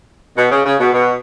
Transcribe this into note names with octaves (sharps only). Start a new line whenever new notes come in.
B2
C#3
C#3
B2
B2